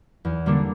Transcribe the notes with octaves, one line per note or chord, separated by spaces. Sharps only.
E2
D3 G3 A#3 D4